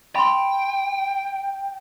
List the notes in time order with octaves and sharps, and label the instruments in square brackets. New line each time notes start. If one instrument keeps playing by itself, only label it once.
[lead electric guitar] G5 [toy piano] B5 C6